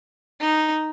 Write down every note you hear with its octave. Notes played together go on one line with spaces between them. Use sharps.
D#4